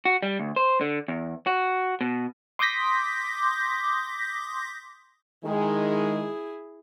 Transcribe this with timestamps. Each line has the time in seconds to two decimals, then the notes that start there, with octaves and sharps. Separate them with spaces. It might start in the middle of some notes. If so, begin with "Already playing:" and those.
0.05 F#4
0.23 G3
0.40 D2
0.56 C5
0.81 D3
1.08 E2
1.47 F#4
2.01 B2
2.59 C6 D6 D#6 G6 A#6 B6
5.45 D#3 G#3 E4 G#4